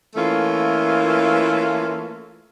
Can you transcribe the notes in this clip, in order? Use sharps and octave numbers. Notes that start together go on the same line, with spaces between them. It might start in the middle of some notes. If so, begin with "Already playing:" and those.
E3 A3 A#3 C#4 F4